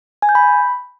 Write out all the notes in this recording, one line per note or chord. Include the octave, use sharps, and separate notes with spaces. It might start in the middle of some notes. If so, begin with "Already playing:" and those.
G#5
G6
B5